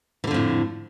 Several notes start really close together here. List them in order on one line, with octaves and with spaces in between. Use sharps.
E3 D3 F2 A2